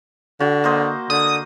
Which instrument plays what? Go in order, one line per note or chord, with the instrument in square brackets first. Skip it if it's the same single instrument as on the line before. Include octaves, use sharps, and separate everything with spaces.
[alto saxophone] D3 [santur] F#4
[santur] A#3 C5 D#5
[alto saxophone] D3 [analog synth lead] D#6